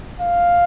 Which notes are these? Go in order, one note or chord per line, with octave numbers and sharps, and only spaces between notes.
F5